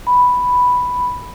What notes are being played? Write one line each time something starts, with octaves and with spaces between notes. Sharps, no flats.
B5